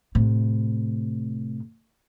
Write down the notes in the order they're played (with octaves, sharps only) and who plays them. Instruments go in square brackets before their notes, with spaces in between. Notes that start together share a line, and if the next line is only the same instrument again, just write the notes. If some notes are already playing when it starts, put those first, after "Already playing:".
[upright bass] A2 C3